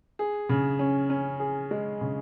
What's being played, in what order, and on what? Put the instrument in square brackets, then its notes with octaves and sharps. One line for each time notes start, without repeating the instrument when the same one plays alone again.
[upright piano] G#4
C#3
C#4
C#4
G#4
G#3
C#3